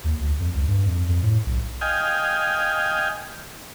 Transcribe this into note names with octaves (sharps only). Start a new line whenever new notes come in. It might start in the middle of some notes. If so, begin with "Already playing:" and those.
D#2
D2
F2
C#2
G2
F2
F2
A2
B1
D#5 F5 G5 G#5